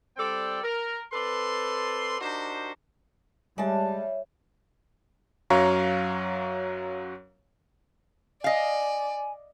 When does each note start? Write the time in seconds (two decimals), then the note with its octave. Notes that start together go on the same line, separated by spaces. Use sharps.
0.17 G3 C4 A4 D5 G5
0.63 A#4
1.13 C4 A4 B4 D5 C6
2.21 D4 D#4 F#4 G4 A#4 C5
3.58 G3 G#3 C#5 E5 A5
5.50 F#2 F#3 C#5 F5 A#5 C#6
8.44 D5 D#5 F5 G#5